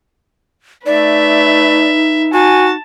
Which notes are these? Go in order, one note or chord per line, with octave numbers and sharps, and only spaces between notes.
A3 D#4 B4 D5 E5
F#4 G#5 A5